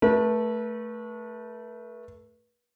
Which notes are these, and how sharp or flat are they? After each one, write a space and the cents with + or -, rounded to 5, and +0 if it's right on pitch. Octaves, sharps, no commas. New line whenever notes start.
A3 +0 B4 -40